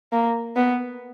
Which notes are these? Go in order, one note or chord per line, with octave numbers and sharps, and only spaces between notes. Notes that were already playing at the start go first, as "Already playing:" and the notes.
A#3
B3